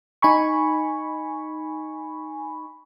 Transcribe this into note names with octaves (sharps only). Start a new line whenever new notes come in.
D#4 G#5 B5 C#6